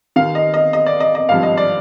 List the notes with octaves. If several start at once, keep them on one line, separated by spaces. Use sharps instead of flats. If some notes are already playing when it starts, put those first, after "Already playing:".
D#2 D#3 F5
D#5
D#5
D#5
D5
D#5
D#5
G#1 G2 F3 F5
D#5
D5